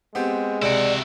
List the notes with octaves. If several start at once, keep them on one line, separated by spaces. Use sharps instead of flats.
G#3 B3 C4 G4
C#2 C3 E4 F#4 D5 D7